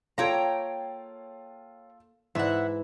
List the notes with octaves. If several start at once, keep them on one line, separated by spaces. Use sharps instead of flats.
A#3 F4 A4 C#5 F5 G5 A#5
G#2 E3 E4 E5 F#5